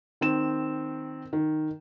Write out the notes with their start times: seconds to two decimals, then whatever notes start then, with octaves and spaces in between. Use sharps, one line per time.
0.21 D#3 C4 E7
1.33 D#3